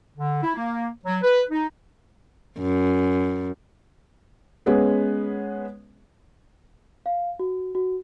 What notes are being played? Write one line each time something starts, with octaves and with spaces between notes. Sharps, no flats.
D3
E4
A#3
F#3
B4
D#4
F#2
G#3 B3 C#4 G#4
F5
F#4
F#4